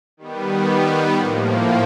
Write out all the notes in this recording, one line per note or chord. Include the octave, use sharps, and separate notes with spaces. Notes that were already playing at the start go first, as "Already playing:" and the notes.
D#3 G3 B3
A2 F3 A#3